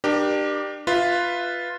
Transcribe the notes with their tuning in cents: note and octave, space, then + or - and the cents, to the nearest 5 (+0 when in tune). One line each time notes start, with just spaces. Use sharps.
D4 +35 G4 +0 A#4 +35
F4 +0 B4 +0 E5 -20